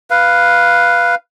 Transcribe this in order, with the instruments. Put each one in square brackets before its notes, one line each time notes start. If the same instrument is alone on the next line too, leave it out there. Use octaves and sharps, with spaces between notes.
[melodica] B4 F5